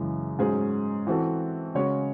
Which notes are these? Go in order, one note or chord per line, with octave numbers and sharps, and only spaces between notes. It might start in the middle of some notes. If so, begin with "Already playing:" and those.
Already playing: F#2 C#3 E3 G#3
G#2 F#3 C#4 G#4 C5
E3 C4 F#4 A4
C#3 G#3 C#4 F#4 C#5